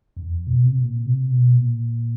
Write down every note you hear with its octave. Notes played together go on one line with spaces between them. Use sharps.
E2
F2
B2
C3
A#2
C3
B2
A#2